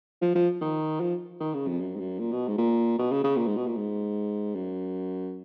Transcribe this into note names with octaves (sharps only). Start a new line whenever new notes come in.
F3
F3
D#3
F3
D#3
C#3
F2
F#2
G#2
F#2
A#2
B2
G#2
A#2
B2
C#3
C#3
A#2
G#2
B2
A#2
G#2
F#2